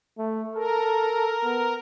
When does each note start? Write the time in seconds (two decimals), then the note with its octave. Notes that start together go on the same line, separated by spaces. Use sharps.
0.18 A3
0.55 A4 A#4
1.44 B3